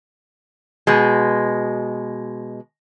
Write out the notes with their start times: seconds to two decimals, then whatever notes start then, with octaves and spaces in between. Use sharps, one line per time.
0.87 B2 G#3